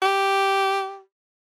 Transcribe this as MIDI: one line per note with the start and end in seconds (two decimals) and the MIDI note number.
0.02 1.00 67